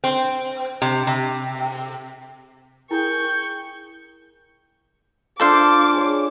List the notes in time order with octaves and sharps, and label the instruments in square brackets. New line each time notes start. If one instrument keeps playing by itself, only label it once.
[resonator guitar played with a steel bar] C4
C3
C3
[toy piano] E4 [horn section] G#4 A#4 G5 [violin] C#6 G6
[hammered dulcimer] D4 F4 [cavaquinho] A4 C5 F5 [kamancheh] D6
[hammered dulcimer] G#4 C#5